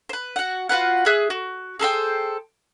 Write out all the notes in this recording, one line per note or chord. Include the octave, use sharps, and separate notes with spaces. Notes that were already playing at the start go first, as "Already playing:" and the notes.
B4 C5
F#4 F#5
F4 F#4 B4 F#5
G#4 E5 F#6
F#4
G#4 A4 C5 G5